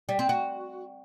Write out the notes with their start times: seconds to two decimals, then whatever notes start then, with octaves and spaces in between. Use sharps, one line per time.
0.09 G3
0.19 C4
0.29 F#4